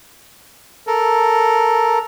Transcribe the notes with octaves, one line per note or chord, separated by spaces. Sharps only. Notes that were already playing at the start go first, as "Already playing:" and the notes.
A4 A#4